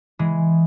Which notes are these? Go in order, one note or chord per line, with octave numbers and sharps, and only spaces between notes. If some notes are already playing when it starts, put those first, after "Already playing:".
E3 G#3